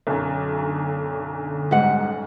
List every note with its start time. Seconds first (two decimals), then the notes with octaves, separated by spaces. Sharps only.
0.07 B1 F#2 D3
1.71 G#2 G3 F#5